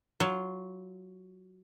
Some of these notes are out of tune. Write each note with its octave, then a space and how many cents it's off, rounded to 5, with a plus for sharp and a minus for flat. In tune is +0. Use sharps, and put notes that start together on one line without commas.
F#3 +5 F4 -10